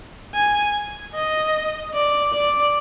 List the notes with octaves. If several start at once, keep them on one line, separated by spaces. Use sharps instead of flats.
G#5
D#5
D5
D5